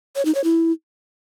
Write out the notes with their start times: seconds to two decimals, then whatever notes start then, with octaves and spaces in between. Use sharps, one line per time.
0.16 C#5
0.25 D#4
0.35 C#5
0.44 E4